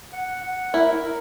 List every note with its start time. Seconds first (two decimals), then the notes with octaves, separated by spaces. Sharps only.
0.13 F#5
0.43 F#5
0.73 E4 A#4
1.04 A#4